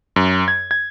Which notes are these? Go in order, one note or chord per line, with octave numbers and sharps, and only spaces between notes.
F#2
G#6
G#6